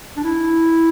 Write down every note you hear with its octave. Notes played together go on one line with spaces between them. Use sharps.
D4
E4